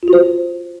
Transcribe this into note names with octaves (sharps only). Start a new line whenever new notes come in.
F4
F#4
C5